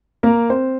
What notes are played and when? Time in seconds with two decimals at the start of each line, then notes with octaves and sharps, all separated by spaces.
0.23 A#3 A#4
0.50 C4 C5